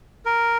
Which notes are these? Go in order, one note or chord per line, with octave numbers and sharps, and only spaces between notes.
A#4